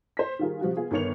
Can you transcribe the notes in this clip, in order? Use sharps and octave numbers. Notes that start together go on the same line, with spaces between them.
C5 B6
D#3 G3 F4 G#4 A#4
C3 F3 G3 F#4
B3 F4 G#4
G1 D#3 A#4 C#5 C#7 F7